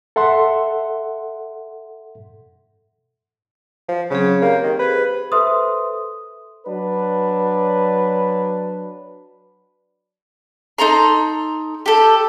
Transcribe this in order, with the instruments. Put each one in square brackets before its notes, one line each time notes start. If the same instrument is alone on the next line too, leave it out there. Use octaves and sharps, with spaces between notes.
[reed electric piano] A4 E5 F#5 C6
[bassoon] F3
[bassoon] C#3 [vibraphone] F#3 C4 G#4
[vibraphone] G#4
[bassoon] A#3 [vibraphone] C4 G4
[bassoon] D#3
[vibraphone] G4 G#4 C5 [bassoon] B4
[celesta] A4 B4 C5 E5 C6 D#6
[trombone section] F#3 D4 B4
[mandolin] D#4 A4 A#5 C6
G4 A4